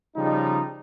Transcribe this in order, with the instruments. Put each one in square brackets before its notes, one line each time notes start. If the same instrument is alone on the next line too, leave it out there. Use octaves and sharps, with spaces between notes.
[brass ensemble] C#3 F3 G3 D#4